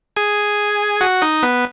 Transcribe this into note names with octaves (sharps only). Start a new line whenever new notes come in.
G#4 G#5
F#4 F#5
D#4 D#5
B3 B4